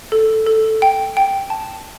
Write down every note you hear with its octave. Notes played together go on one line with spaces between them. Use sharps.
A4
A4
G5
G5
A5